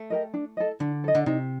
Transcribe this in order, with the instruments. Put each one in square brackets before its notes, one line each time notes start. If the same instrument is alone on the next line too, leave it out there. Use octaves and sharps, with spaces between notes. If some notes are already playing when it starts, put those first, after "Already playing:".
Already playing: [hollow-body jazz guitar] A3
[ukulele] G4 A#4 D#5
D4
A4 D#5
[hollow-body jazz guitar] D3 [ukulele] D4
[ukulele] A4 D#5
[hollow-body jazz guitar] D3
[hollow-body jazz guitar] C3 [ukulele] D#4